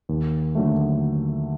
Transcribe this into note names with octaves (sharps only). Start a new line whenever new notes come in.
D#2
D3 F#3 A3